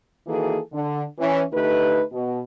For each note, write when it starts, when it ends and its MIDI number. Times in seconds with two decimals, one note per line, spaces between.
0.27 0.59 51
0.27 0.59 52
0.27 0.59 58
0.27 0.59 66
0.27 0.59 68
0.27 0.59 69
0.73 1.03 50
1.19 1.43 52
1.19 1.43 61
1.52 2.02 50
1.52 2.02 57
1.52 2.02 63
1.52 2.02 67
1.52 2.02 71
2.11 2.40 47